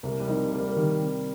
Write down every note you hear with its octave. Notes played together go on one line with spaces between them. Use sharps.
C2 A#3
G3
C3 F3 D#4 A#4
C3 A#3
G3
A#3
D#3 G3
C3